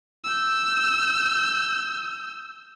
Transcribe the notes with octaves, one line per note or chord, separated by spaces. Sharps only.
E6 G6